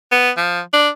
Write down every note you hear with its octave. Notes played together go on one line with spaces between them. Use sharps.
B3
F3
D4